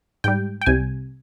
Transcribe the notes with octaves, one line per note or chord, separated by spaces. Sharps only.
G#2 G3 G5
G5
C2 C3 G3 G#5